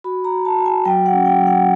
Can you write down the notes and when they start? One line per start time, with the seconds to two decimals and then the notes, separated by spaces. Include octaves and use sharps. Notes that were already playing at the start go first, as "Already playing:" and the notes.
0.04 F#4 B5
0.24 A#5
0.32 F#4
0.45 A5
0.58 F#4
0.66 G#5
0.85 F#3 G5
1.06 F#5
1.13 C#4
1.26 G5
1.39 F#3
1.47 F#5